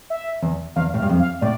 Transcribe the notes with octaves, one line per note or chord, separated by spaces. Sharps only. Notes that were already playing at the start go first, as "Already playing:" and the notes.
E5
E2
E2 F5
A2
F5
G2
F2
F5
A2 D5